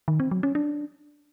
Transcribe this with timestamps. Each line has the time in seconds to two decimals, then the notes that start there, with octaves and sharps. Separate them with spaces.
0.08 D#3
0.20 C4
0.31 F#3
0.43 C#4
0.55 D4